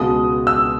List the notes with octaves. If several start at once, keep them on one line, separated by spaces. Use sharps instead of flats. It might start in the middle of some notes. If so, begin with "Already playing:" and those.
Already playing: C#2 B2 G#3 B3 D#6
E6